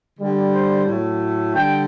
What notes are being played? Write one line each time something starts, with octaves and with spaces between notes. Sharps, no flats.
D3 G3
C5
A2 F#3 A3
D3 G3 G5